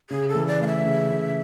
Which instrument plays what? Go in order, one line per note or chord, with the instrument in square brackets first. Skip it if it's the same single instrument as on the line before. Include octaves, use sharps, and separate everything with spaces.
[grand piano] C#3 [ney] G#4
[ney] A4
[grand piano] E3
[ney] D5
[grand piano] A3 [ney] F5
[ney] E5
[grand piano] C#3
C#3